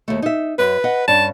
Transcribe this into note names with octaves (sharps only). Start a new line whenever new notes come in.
D#2 A3
D#4 E5
F#2 B4
D#5 F#5
G2 C#4 A5